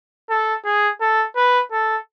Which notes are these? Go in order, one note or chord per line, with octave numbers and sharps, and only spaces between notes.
A4
G#4
A4
B4
A4